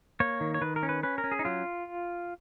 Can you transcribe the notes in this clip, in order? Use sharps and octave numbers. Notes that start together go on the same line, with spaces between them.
A#3 C#5
D#3
C#5
D#3 B4
A#4
C#4
B4
C#4 B4
A#4
C#4
G#4
D#4
F#3 F4